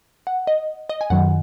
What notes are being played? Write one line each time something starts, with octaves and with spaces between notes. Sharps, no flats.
F#5
D#5
D#5
G#5
F#2 D#3 F#3 F#5